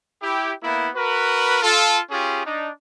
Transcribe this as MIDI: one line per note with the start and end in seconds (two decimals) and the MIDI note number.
0.23 0.52 64
0.23 0.52 67
0.63 0.89 58
0.63 0.89 59
0.63 0.89 64
0.95 1.60 66
0.95 1.60 70
0.95 1.60 71
1.62 2.00 65
1.62 2.00 69
2.11 2.44 61
2.11 2.44 65
2.11 2.44 67
2.11 2.44 68
2.45 2.70 62
2.45 2.70 63